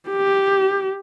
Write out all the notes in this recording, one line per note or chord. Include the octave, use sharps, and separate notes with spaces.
G4